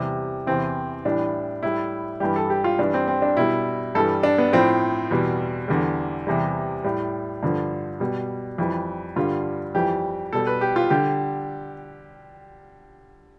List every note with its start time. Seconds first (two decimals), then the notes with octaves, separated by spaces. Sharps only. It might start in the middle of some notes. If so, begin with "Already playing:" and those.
Already playing: E2 C3 G3
0.47 E2 C3 E3 C4
1.05 A2 E3 G3 D4
1.63 A2 G3 E4
2.20 G2 E3 G3 G4
2.36 A4
2.50 G4
2.64 F4
2.79 G2 E3 G3 D4
2.94 C4
3.08 C4
3.22 D4
3.36 B2 G3 E4
3.95 G2 E3 G3 A4
4.23 D4
4.38 B3
4.53 A2 F3 C4
5.11 E2 B2 G3
5.68 E2 D3 G3
6.27 E2 C3 E3 G3
6.84 A2 G3
7.43 G2 D3 F3
8.00 B2 G3
8.58 F2 E3 G3
9.16 G2 D3 G3 F4
9.75 F2 E3 G3 G4
10.33 B2 G3 A4
10.47 B4
10.61 G4
10.76 F4
10.90 D3 G3 G4